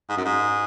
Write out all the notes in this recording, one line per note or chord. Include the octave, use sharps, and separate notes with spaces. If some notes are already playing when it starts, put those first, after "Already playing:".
G#2
F#2
G#2